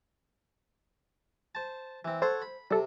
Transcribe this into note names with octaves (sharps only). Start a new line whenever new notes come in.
C5 A5
E3 C4
A4 C5 C#5 F#5
B5
C3 G3 A4